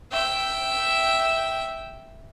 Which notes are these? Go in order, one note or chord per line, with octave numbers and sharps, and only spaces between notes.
E5 G5